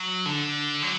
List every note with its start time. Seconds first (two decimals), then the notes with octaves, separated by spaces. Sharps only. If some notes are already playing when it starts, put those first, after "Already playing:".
Already playing: F#3
0.26 D3
0.83 F#3